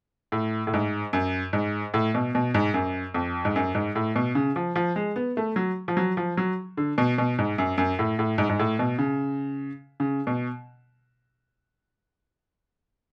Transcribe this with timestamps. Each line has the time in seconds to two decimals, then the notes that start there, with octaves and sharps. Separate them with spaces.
0.32 A2
0.67 A2
0.74 G#2
1.13 F#2
1.53 G#2
1.94 A2
2.15 B2
2.35 B2
2.54 G#2
2.74 F#2
3.14 F2
3.45 G#2
3.56 F#2
3.75 G#2
3.95 A2
4.16 B2
4.35 C#3
4.56 F3
4.76 F3
4.96 G#3
5.16 B3
5.37 A3
5.56 F#3
5.88 F3
5.97 F#3
6.17 F3
6.37 F#3
6.77 D3
6.98 B2
7.18 B2
7.39 G#2
7.58 F#2
7.78 F#2
7.99 A2
8.19 A2
8.38 G#2
8.49 G#2
8.59 A2
8.79 B2
8.99 C#3
10.00 C#3
10.27 B2